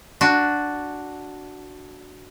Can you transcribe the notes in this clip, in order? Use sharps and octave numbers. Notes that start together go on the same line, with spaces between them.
D4 F#4